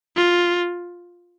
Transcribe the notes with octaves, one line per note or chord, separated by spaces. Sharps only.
F4